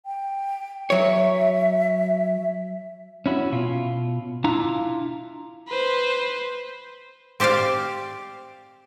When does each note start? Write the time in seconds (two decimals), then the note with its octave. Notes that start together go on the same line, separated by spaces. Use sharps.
0.06 G5
0.90 F#3 C#5 E5
3.26 C#4 E4 F#4
3.52 B2 F4
4.44 D4 E4 F4 A#5
5.68 B4 C5
7.40 C4 G4 C5 D5 F5